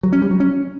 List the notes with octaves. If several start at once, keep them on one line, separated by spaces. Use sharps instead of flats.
F#3
C#4
G3
F#3
C#4